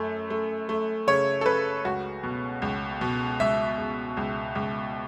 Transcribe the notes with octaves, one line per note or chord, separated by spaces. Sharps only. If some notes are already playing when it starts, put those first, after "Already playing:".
Already playing: F#2 A3
A3
A3
C#3 C#5
A4
C#3 B4
C#2 F#4
B2
C#2
B2
C#2 E5
C#2
C#2
C#2